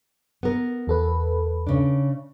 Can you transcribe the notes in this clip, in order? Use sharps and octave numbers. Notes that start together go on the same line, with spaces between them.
B3 A#4
E2 A4 B4
C#3 D4